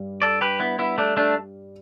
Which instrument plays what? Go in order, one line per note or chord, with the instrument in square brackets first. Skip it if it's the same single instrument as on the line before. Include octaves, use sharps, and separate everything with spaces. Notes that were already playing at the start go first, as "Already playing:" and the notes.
Already playing: [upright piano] G2 G3
[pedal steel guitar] A4 D5
G4 B4
B3 E4
B3 E4
A3 D4
A3 D4